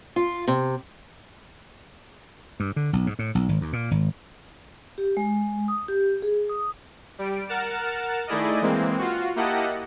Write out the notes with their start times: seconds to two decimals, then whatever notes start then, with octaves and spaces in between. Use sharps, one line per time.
0.16 F4
0.48 C3
2.60 G2
2.76 D3
2.93 B1
3.07 G#2
3.19 A2
3.35 B1
3.49 G#1
3.61 D#2
3.73 A#2
3.91 G#1
4.98 G4
5.17 G#3
5.68 D#6
5.89 G4
6.22 G#4
6.49 D#6
7.19 G3 D7
7.49 A#4 F#5 F6 A6 E7
8.27 D#3 A3 E4 G#4 D5 D#5
8.61 E3 G#3 A#3 C4
8.98 F4 F#4
9.36 A#3 E4 G4 D#5 F#5 A5